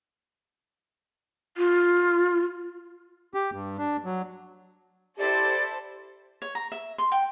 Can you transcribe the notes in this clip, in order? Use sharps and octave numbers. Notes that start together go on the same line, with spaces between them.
F4
G4
G2
D4
F#3
E4 G4 A4 C5 D5
C#5
A#5
E5
C6
G5